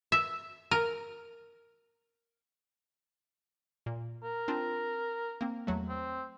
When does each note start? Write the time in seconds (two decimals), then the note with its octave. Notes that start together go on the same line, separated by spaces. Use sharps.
0.12 E5
0.71 A#4
3.86 A#2
4.24 A#4
4.48 C4 D4 F4
5.41 A#3 C4
5.67 E2 F#3 A3
5.89 C4